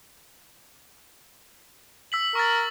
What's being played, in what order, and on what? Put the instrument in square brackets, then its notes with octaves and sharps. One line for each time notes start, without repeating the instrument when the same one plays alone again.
[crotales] E6 B6 F#7
[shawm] A#4 [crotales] C#6 A6